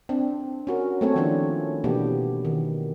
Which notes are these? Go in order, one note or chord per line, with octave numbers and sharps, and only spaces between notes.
C4 D4
C#4 F#4 A#4
A3 A#3 C4 A4 C#5
D#3 F3 B3 C#4 D4 E4
B2 E3 A#3 B3 D4 G4
D#3